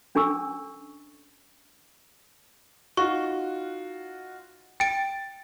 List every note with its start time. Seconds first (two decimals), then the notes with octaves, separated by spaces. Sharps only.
0.15 C#4 D4 A4 G#5 C#6 E6
2.97 D#4 F4 F#4 C#6
4.80 G5 A6 D7